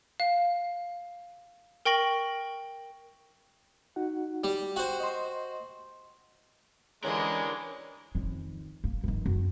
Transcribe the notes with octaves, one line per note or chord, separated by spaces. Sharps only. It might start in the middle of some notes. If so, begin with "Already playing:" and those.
F5
A#4 G5 C#6 A#6 F#7
D#4 F#4 F#5
G3
F#4 C5 G5
D#5 C6
D3 E3 G#3 C#4 D4 G4 A#4
F2 D#3
A#3
G1 D#3
F#2